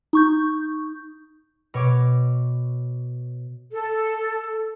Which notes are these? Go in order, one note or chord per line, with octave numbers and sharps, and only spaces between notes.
D#4 C#6 G6
B2 C#5 D6
A4